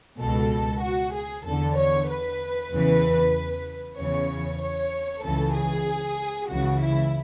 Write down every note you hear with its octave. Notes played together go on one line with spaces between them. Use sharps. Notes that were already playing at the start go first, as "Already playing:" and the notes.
C#2 B2 A4
F#4
G#4
E2 D3 A4
C#5
B4
E2 C#3 E3
E2 C#3 E3 C#5
C#5
C#2 C#3 E3 A4
G#4
C#2 C#3 E3 F#4
E4